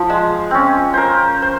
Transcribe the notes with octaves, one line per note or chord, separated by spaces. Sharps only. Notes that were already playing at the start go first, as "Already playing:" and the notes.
Already playing: F3
G#3
C4 C#4
A#4 C5
C5